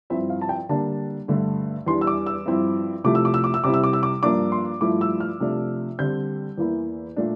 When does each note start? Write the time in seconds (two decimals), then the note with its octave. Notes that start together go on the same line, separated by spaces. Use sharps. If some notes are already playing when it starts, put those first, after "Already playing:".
0.10 G2 F3 C4 E4 E5
0.30 F5
0.41 A5
0.49 G5
0.69 D3 G3 A#3 D4 A5
1.28 G2 D3 A3
1.86 E2 E3 G3 D4 C6
2.01 E6
2.07 D6
2.26 E6
2.46 G2 F3 C4 E4
3.04 C3 F3 A3 E4 D6
3.15 E6
3.25 D6
3.34 E6
3.44 D6
3.54 E6
3.64 C3 G3 C4 E4 D6
3.74 E6
3.84 D6
3.93 E6
4.03 D6
4.23 G2 F3 A#3 D4 D6
4.52 C6
4.81 G2 F3 A3 E4 D6
5.01 E6
5.20 F6
5.40 C3 F3 A3 D4
5.99 D3 G3 C4 G6
6.58 E2 E3 A#3 E4
7.16 A#2 A3 D4